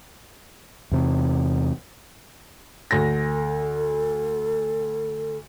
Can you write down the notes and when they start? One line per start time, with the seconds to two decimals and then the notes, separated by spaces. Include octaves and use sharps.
0.92 E2 C3
2.91 D2 A4 A#6